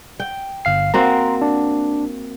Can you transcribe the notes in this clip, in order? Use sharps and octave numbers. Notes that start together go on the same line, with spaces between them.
G5
G1 F5 C7
A#3 C4 F#4 A#5 C6
D4